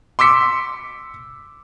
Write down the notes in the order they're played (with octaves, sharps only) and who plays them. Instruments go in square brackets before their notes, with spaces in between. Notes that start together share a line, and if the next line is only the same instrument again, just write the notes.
[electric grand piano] C6 D6 E6 B6 C#7